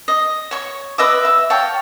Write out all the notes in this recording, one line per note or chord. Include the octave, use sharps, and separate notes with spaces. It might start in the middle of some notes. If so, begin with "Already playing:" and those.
D#5
C#5 C#6
B4 D#5 E5 D6
E5
C#5 F5 G5 A5